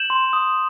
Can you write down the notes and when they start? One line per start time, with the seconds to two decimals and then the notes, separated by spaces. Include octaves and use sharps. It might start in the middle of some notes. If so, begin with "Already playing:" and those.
Already playing: G6 E7 F#7
0.10 C6
0.33 D#6